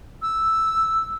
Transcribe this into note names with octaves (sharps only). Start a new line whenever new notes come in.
E6